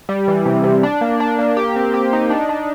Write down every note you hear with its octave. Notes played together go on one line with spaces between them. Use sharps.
G3
E3
C3
C3
D4
A#3
D4
A#3
G4
C4
G4
D#4
D4
D4